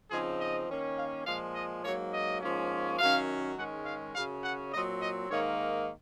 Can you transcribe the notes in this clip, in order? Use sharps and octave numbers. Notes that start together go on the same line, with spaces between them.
C#3 F3 C4 D#4 G#4
D#5
D#3 A#3 C#4
F5
A#2 F3 G#3 F5
D#5
G#2 F#3 A#3 C#5
D#5
G#2 F3 A#3 C#4
F#2 D#3 F#3 C#4 F5
G#2 D#3 G#3 C#4 F#5
F5
F#2 C#3 F#3 C#4 F5
F#5
A#2 F#3 C4 D#5
D#5
G#2 D#3 A#3 D#4 C#5